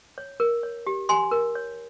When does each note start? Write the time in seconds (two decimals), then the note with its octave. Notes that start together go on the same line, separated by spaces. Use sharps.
0.18 C#5
0.40 A#4
0.63 C#5
0.87 G4
1.09 G4 G#5 C6
1.31 A#4
1.55 C#5